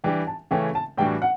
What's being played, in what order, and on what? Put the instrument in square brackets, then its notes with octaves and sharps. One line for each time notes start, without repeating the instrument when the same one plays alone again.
[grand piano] E3 G3 D4 G4 [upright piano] G5
[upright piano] A5
[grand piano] C#3 E3 A3 C#4 [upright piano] G5
[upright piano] A5
[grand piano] A2 E3 G3 D4 F#4 [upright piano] G5
[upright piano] F#5